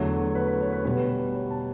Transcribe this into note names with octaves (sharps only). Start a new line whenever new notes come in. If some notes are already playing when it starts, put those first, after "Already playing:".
Already playing: E2 D3 F#3 A3 C#5
B4
B4
C#5
B4
B2 G3 B3 B4
C#5
A5